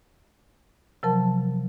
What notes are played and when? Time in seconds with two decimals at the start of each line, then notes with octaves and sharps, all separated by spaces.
1.03 C3 F3 F#3 A#4 A5